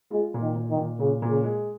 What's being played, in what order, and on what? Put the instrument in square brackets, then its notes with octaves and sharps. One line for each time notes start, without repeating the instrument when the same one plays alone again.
[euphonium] G#3 [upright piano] F4
[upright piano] A#2
[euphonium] D#3
[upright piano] A#2
[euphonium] D#3
[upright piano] A#2
[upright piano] A#2 [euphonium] C#3
[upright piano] A#2
[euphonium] C#3
[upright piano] G#3